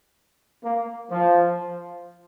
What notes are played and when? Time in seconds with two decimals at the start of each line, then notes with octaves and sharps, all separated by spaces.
0.64 A#3
1.11 F3